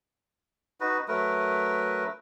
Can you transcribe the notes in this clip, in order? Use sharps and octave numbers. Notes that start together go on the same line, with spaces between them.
D#4 F#4 B4
F#3 A3 A#4 B4